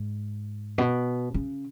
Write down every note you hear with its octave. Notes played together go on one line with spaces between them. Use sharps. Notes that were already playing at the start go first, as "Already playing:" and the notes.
Already playing: G#2
B2
C#3